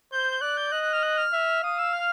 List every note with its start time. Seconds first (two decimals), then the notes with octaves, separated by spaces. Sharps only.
0.12 C5 G6
0.41 D5 F#6
0.57 G6
0.72 D#5 F#6
0.82 F#6
0.93 F6
1.03 F#6
1.17 F6
1.33 E5
1.63 F5 D#6
1.79 E6
1.93 F6